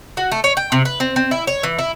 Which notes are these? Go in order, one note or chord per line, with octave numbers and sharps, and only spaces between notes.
F#4
A3
C#5
G5
C3
B4
C4
C4
E4
C#5
E3
E4